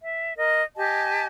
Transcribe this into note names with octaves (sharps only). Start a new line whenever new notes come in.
E5
A#4 D#5
G4 D#5 G#5 A5